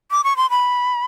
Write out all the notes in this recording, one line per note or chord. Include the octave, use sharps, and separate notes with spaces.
D6
C#6
C6
B5